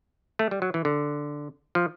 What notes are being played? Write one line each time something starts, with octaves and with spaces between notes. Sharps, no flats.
A3
G3
F#3
E3
D3
F3